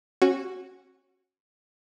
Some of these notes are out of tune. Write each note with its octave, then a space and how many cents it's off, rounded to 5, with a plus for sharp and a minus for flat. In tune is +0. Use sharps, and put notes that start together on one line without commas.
C#4 -25 F#4 +0